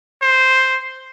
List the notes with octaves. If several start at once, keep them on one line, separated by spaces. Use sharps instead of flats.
C5